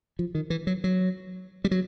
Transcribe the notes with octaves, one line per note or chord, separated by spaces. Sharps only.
F3
D#3
E3
F#3
F#3
G3
F#3